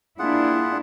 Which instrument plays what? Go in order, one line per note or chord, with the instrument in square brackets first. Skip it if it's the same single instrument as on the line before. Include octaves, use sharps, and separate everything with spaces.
[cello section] A#3 D4 E4 [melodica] F4 G#4 F#5